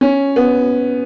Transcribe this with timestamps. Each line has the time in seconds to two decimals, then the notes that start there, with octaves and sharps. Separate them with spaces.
0.01 C#4
0.36 B3